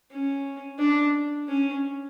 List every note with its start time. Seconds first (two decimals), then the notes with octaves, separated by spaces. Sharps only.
0.11 C#4
0.79 D4
1.48 C#4